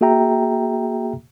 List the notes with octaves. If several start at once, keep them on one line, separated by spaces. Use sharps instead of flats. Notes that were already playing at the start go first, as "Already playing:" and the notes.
A#3 F#4 G#4 E5 G5 A#5